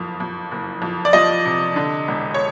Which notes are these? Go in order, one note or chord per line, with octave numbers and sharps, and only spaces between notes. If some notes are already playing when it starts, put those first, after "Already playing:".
Already playing: F#1 F2 F3
F2
F#1
F2
D5
F3 D#5
C3
D3
E1
C#5